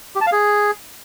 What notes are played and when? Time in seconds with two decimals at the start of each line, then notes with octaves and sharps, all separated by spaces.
0.15 G4
0.21 A5
0.27 F5
0.32 G#4